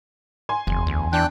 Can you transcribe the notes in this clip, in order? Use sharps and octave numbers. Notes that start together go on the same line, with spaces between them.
G#5 C6
F#1 E2
D2
E3 D4 G5 F#6